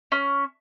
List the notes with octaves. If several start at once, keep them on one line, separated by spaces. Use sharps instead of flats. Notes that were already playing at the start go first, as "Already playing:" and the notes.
C#4